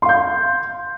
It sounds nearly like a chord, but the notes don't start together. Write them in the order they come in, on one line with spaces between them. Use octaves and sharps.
C6 F5 G6